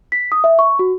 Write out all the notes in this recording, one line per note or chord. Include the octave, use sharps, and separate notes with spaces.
B6
D#6
E5
C#6
F#4